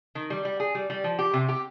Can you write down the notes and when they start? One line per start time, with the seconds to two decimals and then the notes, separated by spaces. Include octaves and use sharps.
0.15 D#3
0.30 G3
0.45 G3
0.60 G#4
0.75 G3
0.90 G3
1.04 F3
1.19 G4
1.33 C3
1.49 G4